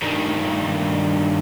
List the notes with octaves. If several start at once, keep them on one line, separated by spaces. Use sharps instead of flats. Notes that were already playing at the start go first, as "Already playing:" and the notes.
G2 D#3